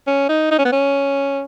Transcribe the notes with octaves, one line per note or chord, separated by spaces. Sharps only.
C#4
D#4
D#4
C#4
B3
C#4